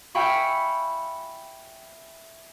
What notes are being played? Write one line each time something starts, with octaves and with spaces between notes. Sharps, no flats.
E5 F5 G5 G#5 B5 C#6